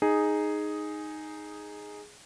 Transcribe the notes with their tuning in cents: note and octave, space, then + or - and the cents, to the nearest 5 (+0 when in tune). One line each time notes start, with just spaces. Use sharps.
D#4 -5 G#4 +0